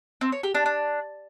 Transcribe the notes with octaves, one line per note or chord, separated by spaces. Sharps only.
C4
C#5
G4
D4
D4